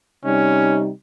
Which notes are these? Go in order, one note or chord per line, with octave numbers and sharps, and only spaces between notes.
C3 G3 C#4 D#4